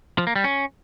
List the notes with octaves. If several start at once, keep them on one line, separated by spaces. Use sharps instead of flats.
F3
A#3
G3
C#4